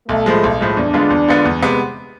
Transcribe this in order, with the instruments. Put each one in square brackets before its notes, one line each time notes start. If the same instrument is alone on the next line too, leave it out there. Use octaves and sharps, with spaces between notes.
[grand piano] B1 [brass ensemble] A3
[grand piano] A2 F3 G#3
B1
A2 F3 G#3
[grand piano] E2 [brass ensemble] D4
[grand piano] D3 G#3 B3 F4
E2
D3 G#3 B3 F4
E2
C3 G#3 B3